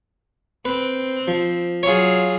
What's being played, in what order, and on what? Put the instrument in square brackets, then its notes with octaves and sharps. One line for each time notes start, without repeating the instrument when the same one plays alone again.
[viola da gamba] C4 [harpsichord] B4
[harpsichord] F3
[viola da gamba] F#3 F4 G#4 [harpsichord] C#5